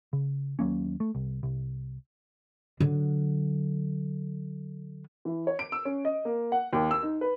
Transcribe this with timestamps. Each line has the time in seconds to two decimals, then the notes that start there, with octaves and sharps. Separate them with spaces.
0.13 C#3
0.59 D#2 F#3 A#3 C#4
1.00 A3
1.15 C2
1.43 C2
2.80 D3 F#3
5.25 E3
5.47 C#5
5.59 D7
5.72 E6
5.85 C#4
6.05 D#5
6.25 A#3
6.52 F#5
6.73 D#2
6.91 E6
7.02 D#4
7.21 B4